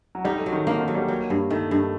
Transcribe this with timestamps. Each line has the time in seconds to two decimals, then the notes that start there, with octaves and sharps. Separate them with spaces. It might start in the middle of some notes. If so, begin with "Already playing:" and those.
0.15 F#3
0.25 G3 D#4
0.38 A3
0.46 F#3
0.53 D#3
0.66 D3 A#3
0.81 D#3
0.88 F#3
0.95 G3
1.08 F#3
1.30 G2
1.50 D#3 A3
1.71 G2